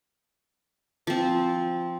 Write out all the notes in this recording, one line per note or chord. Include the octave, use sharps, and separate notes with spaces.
F3 C4